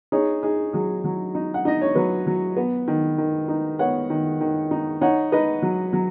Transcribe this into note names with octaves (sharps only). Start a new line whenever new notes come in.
D#4 G#4 C#5
D#4 G#4
F#3 G#4
F#3
D#4
F#5
D#4 D#5
C#5
F#3 B4
F#3
B3
D#3
D#3
D#4
B3 C#5 F#5
D#3
D#3
D#4
D#4 C#5 F#5
D#4 B4 D#5
F#3
F#3